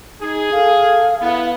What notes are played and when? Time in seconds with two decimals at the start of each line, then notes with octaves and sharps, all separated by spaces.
0.21 D#4 G#4
0.52 A4 F5
1.21 B3 E4